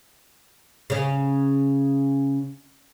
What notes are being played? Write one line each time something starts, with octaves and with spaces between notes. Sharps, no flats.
C#3 C#4